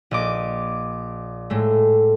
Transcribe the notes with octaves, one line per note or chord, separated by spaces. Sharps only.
A#1 D#5 D6
A2 G#3 A3